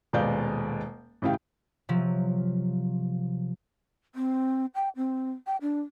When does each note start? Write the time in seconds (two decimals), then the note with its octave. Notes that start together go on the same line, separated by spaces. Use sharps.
0.13 D#1 B2 G#3 D5 F5 G6
1.22 A1 C#3 E3 G4 F5 G5
1.89 C3 F3 F#3
4.15 C4
4.75 G5
4.96 C4
5.47 G5
5.61 D4